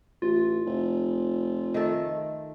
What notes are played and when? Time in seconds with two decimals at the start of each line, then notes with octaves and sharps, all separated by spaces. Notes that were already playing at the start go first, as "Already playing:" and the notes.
0.22 A1 F4
0.66 F1
1.74 D#3 A3 A4